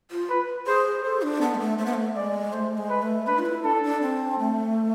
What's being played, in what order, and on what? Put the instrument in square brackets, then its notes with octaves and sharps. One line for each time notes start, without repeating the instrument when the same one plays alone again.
[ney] F4
[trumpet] B4
[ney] G#4 [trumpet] C5
[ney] A4 [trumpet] C5
[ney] D4
[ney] B3 [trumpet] A4
[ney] G#3
A3
[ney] A3 [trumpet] C5
[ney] B3
A3
[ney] G#3 [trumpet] D5
[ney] A3 [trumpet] C5
[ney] G#3
[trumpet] B4
[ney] A3
[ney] D4 [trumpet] B4
[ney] F4
E4
[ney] D4 [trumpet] A4
[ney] D4
C4
A3